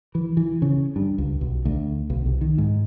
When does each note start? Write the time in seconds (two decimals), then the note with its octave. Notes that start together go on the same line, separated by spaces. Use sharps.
0.15 E3
0.37 E3
0.62 C#3
0.96 G2
1.18 C#2
1.41 B1
1.65 D2
2.10 B1
2.26 C2
2.41 D#3
2.58 G#2